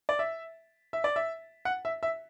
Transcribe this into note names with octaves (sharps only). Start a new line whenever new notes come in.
D5
E5
E5
D5
E5
F#5
E5
E5